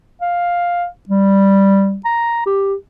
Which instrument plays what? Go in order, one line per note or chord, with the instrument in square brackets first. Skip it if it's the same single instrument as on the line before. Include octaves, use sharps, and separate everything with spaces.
[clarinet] F5
G3
A#5
G4